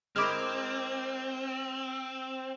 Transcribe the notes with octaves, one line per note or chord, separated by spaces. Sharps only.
G#3 C4 E4 A#4 D6 F6